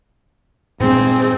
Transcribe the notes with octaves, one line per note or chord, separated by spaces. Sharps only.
G2 A#2 G#3 C4 G#4